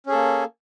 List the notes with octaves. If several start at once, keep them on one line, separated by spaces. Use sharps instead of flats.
A#3 C#4 G#4 A4